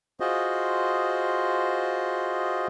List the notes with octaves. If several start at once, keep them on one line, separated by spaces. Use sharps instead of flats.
F4 F#4 G#4 C5 D#5